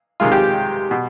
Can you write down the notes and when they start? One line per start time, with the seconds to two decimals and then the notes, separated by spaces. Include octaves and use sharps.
0.20 C3 D#3 G#3 F4
0.32 G4
0.91 B2